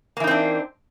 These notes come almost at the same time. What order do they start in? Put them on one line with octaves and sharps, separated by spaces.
A#3 E3 D#4 C4 D4